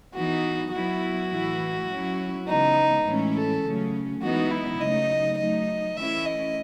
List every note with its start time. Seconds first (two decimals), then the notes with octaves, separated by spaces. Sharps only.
0.14 E3 B3 D#4 F#4
0.72 F#3 B3 E4 F#4
1.31 A2 E3 A3 E4
1.88 F#3 C#4 E4
2.47 C#3 E3 G#3 B3 D#4
3.06 A2 E3 G#3 C#4 E4
3.35 A4
3.64 C#3 F#3 A3 C#4
4.22 E3 G#3 B3 D#4 F#4
4.51 E4
4.80 C#3 F#3 A3 D#4 D#5
5.38 F#3 A3 D#4 D#5
5.96 E3 A3 C#4 E4 E5
6.25 D#5